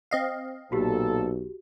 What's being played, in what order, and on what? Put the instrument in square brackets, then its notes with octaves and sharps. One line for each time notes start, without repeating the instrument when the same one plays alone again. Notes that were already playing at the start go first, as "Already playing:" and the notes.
[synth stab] C4 D#5 F5
[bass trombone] B1 [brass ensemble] A#2 A4 [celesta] F#4 G4